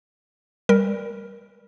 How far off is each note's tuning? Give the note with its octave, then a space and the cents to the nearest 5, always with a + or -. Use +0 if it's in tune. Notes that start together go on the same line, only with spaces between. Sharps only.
G3 +0 A#4 +0